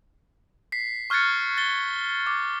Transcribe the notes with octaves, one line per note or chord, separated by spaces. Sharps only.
B6 C7
C#6 F6 F#6 G#6 A6 C#7
A6 G7
D6